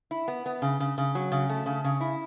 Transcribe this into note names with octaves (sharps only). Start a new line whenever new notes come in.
E4
B3
B3
C#3
C#3
C#3
F#3
C#3
A3
C#3
C#3
E4